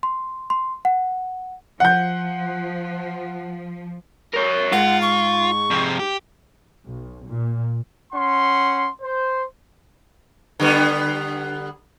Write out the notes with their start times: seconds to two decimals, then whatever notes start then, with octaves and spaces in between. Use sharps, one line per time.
0.03 C6
0.50 C6
0.85 F#5
1.80 F3 F#5 G6
4.33 A#4 C#5
4.73 G#2 F4 F#5
5.02 C#6
5.71 F2 C3
5.99 G4
6.87 B1
7.28 A#2
8.13 C#4 F#5 C6
9.01 C5
10.59 D3 G3 B3